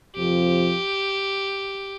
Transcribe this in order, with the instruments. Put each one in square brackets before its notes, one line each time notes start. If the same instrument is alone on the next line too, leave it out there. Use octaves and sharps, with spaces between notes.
[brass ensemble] F2 C3 F3 [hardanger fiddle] G4